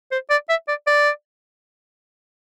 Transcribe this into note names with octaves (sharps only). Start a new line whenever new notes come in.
C5
D5
E5
D5
D5